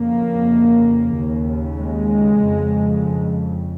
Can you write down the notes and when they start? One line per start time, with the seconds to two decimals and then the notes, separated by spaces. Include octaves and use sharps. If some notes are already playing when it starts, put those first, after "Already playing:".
Already playing: F2 C#3 A#3
1.16 D#2 C#3
1.79 G#3
2.42 F2 C#3